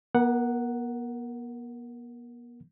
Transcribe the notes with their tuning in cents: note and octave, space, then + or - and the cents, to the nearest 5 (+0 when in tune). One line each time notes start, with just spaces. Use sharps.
B3 -45 A#4 +0 F#5 +0